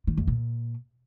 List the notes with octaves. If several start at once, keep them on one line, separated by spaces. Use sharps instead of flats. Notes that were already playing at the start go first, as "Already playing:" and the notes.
D#3
F2
A#2